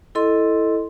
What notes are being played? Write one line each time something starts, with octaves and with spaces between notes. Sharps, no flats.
E4 A4 D#5 C6